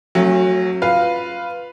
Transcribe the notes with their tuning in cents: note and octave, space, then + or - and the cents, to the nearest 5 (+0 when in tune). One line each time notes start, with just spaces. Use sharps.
F#3 +0 A3 +30 C#4 -35
F4 +0 B4 +0 F5 -5